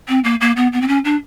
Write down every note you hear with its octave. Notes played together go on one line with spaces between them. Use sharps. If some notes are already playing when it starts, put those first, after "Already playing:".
C4
A#3
A#3
B3
B3
C4
C#4
D4